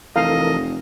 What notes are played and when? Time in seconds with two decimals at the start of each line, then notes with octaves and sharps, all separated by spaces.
0.16 F1 E3 A4 A#4 D#5 F5